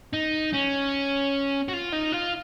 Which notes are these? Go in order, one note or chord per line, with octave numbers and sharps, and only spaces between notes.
D#4
C#4
F#4
F4
D#4
F4